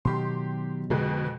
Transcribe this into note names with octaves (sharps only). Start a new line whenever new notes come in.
B2 D#3 F#3 G4 C6
F2 B2 D3 G#3